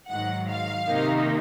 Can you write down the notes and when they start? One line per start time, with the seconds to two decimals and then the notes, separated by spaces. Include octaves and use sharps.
0.09 G#2 D#3 F#3 F#5
0.48 F5
0.88 C3 D#3 A#3 D#4